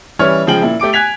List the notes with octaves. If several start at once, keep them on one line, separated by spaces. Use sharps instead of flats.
E3 G3 C#4 E4 C#5 F6
C#3 F3 G#3 G5 F#7
A#2 E4
A3 G4 D6 D7
G#5 F#6 G#6 B6 F7